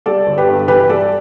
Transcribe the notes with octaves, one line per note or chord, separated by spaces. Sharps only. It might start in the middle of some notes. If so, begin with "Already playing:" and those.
G3 A4 D5
G1
G4 B4
G2
E3 G4 B4
G3 A4 D5